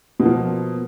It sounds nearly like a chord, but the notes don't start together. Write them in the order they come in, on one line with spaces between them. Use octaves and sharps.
B2 A#3 F3